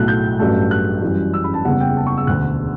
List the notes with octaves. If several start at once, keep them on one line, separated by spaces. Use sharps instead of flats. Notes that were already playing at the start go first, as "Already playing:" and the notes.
Already playing: B1 A2 F#3 A3 F#6
G6
A1 G2 F#3 A3
F#6
F#2 E3 G3
E6
B5
A5
F#1 E2 C#3 G3 F#5
G5
A5
C#6
E6
E1 D2 D3 F#6